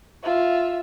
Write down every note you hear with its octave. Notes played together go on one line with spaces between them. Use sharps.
F4 E5